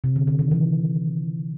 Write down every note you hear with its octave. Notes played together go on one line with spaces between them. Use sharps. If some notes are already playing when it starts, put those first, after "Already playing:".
C3
D3
D3
D#3
E3